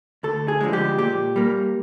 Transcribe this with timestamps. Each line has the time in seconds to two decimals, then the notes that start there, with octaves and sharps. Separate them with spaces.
0.23 D2 A4
0.48 G#4
0.61 D3 F3 G#3
0.73 G4
0.98 A#2 G4
1.36 G3 A#3